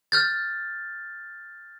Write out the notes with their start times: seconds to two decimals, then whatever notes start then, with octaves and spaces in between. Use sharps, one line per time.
0.12 F6 G6 A6